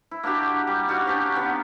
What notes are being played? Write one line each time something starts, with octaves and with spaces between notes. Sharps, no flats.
E4
A#3 D4 F#4 G4
G3
D#4 F#4 D5 F5
C#4 D4 G4 C#5
D#3 B3